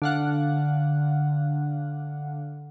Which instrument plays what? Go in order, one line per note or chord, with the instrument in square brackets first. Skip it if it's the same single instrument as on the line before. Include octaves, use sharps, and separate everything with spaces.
[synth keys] D3 F5 F#5